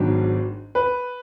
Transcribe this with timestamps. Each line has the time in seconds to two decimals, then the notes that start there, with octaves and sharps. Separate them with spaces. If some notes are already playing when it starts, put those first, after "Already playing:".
Already playing: G#1 G#2 F#3 B3 D4
0.75 B4